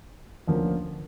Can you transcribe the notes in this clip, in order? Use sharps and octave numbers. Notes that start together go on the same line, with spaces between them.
D2 D3 F3 A#3 C#4